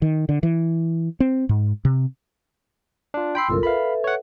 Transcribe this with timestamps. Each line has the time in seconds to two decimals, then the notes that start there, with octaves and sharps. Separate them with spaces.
0.02 D#3
0.29 D3
0.43 E3
1.20 C4
1.49 G#2
1.85 C3
3.14 D4 F4
3.35 G5 B5 C6 E6 C7
3.49 G1 C2 F#2 F4 A4 A#4
3.63 A4 B4 E5 F5 B5
4.04 C#5 F#5